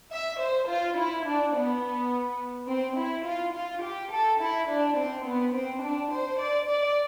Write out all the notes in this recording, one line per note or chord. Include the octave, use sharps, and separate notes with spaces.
E5
C5
F4
E4
D4
B3
C4
E4
F4
F4
G4
A4
E4
D4
C4
B3
C4
D4
C5
D5
D5